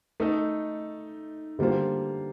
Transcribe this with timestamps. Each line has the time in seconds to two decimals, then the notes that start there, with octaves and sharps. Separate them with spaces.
0.20 A3 D#4 A4 D#5
1.59 D3 G3 A#3 F4 C5